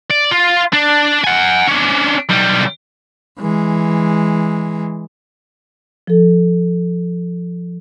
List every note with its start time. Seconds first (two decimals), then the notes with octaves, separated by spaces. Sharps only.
0.11 D5
0.31 F4
0.73 D4
1.24 F#5 G#5
1.68 C#4 D4
2.29 B1 G3
3.40 E3 G#3
6.07 F3 A4